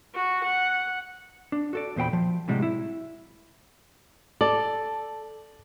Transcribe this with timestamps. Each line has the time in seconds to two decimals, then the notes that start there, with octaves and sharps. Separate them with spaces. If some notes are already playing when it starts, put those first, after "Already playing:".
0.15 F#4
0.44 F#5
1.52 D4
1.73 F#4 A4 D5
1.96 E2 A#2 C5 G5 B5
2.13 F3
2.48 A2 C3 G3 G#3 F#4
2.62 E4
4.41 A4 D5